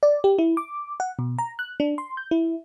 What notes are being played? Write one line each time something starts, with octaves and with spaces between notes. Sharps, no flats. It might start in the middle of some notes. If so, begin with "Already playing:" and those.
D5
G4
E4
D6
F#5
B2
A#5
F#6
D4
C6
G6
E4